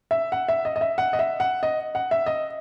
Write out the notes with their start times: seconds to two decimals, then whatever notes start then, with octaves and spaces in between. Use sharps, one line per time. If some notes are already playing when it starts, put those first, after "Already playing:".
0.11 E5
0.32 F#5
0.48 E5
0.65 D#5
0.76 D#5
0.81 E5
0.98 F#5
1.13 D#5
1.19 E5
1.40 F#5
1.63 D#5
1.95 F#5
2.11 E5
2.26 D#5